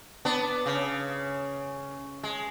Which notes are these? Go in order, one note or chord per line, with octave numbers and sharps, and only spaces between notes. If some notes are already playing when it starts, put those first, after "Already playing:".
B3 D4
C#3
G#3